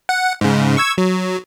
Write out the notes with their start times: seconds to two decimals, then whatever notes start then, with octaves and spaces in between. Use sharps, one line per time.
0.09 F#5
0.41 G#2 C#3
0.77 C#6 E6 G#6
0.98 F#3